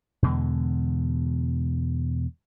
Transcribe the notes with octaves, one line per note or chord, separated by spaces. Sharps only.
E2 B2 D3 G#3